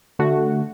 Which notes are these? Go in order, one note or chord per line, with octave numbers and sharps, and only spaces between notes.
D3 A3 F#4